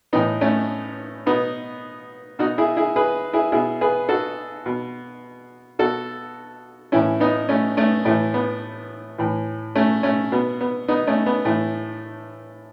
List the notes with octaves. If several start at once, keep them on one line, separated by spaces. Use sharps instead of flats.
A2 E3 B3 D#4
A3 C#4
B2 B3 D#4
B2 D#4 F#4
E4 G#4
E4 G#4
G#4 B4
E4 G#4
B2 E4 G#4
G#4 B4
F#4 A4
B2
B2 F#4 A4
A2 E3 C#4 E4
B3 D#4
A3 C#4
A3 C#4
A2 E3 A3
B3
A2 E3
A3 C#4
A3 C#4
B2 B3
B3
B3 D#4
A3 C#4
B3
A2 E3 A3